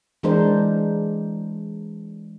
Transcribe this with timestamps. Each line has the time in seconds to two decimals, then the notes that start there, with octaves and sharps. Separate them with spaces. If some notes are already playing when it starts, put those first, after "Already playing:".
0.23 E3 G#3 D4 A#4 C5